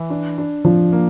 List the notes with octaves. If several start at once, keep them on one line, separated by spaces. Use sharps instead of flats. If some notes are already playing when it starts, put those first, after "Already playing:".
Already playing: E3
D4
D4
F3 D4
A#3